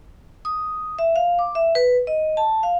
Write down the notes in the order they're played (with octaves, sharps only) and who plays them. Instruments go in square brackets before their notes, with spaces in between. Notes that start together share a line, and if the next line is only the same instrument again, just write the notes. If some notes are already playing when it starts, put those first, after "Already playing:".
[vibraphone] D#6
E5
F5
D6
E5
B4
D#5
A5
F5